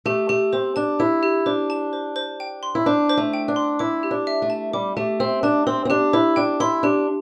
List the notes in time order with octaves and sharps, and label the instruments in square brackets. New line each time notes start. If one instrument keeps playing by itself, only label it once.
[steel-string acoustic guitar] A3 [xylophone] G4
[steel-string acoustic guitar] A3 [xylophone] G4
[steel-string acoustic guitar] C4 [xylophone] C5
[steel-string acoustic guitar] D4 [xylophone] A5
[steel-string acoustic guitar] E4 [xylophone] G4
[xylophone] G4
[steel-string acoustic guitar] D4 [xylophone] C5
[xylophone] A5
C5
C5
G5
C6
[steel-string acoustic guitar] E4
[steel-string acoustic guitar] D4 [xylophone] C5
[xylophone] C5
[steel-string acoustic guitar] A3
[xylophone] G5
[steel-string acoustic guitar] D4
[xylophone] C6
[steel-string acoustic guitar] E4 [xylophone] D6
[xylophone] G4
[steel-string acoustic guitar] D4
[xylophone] E5
[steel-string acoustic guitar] A3
[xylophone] A5
[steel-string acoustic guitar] G3 [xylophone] D6
[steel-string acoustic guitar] A3 [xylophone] G4
[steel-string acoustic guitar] C4 [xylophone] E5
[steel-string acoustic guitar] D4 [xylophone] A5
[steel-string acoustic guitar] C4 [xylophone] C6
[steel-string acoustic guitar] C4
[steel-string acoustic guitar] D4 [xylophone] G4
[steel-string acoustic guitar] E4 [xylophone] C5
[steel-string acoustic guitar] D4 [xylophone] G5
[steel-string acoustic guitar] E4 [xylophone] C6
[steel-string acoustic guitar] D4 [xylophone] G4